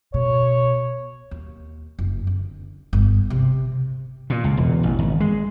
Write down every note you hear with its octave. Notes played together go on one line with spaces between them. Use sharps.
B2 C#5
D#2
F#1
D3
G1
C3
A#2
C#2
E1
A1
G#1
G#3